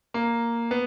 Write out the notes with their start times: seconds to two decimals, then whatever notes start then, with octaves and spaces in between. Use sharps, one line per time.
0.14 A#3
0.71 B3